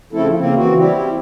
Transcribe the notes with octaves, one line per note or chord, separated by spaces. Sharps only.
C#3 F3 A3 C4 E4 A4
C#3 A#3 C4
E3 C4 F#4
G3 C4 E4 G4